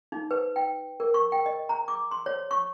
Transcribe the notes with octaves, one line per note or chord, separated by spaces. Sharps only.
D#4
B4
G5
A#4
C#6
G5
D#5
A#5
D6
C6
C#5
C#6